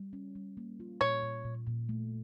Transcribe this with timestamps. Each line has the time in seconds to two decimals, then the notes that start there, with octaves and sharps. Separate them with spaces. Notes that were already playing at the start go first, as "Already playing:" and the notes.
Already playing: G3
0.13 C#4
0.35 G3
0.57 A#3
0.80 F4
1.01 A#2 C#5
1.23 A#2
1.45 A#2
1.67 A#2
1.89 A3